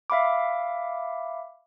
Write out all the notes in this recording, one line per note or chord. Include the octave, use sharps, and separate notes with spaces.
E5 F5 B5 D6